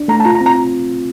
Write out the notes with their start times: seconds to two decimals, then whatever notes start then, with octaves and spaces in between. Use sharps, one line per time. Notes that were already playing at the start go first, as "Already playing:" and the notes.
Already playing: D4
0.08 A3 A#5
0.20 A5
0.25 F4 A#5
0.35 A#5
0.41 C4
0.46 A#5